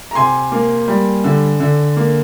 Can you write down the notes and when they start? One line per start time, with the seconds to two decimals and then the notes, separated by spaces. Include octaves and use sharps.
0.11 A#5
0.15 C3 G#5 C6
0.52 A#3
0.88 G3
1.24 D3
1.60 D3
1.97 A#3